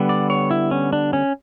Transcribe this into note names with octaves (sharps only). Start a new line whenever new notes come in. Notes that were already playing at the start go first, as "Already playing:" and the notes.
Already playing: D3 G3 B3
D5
C#5
E4
C#4
D4
C#4